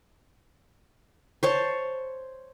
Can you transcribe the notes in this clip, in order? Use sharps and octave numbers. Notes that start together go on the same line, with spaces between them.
C5 C#5 A5